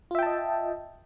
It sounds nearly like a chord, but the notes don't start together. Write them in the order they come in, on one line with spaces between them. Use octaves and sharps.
F4 E5 G5 A5 D#5